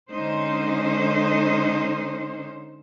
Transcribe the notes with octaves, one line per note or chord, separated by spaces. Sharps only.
D3 G#3 C#4 D#4 C5